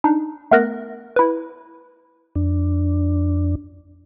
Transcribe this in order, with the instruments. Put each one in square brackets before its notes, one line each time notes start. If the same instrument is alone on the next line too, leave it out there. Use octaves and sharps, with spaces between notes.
[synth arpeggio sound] D4 D#4
A3 B3 A#4 F#6 A#6
E4 B4
[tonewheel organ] F2 D4